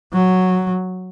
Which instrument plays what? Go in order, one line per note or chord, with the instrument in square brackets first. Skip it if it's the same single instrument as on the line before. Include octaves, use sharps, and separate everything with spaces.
[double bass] F#3